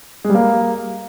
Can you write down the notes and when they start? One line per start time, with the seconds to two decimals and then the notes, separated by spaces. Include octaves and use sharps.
0.25 G#3
0.30 G3
0.35 A#3